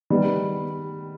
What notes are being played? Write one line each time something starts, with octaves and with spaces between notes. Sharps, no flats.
D#3 G3 B3